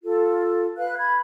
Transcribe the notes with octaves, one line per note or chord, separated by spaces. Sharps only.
F4 A4
B4 F5 F#6
B5 G#6